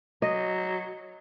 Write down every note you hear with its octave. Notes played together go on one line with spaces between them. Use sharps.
F#3 D#5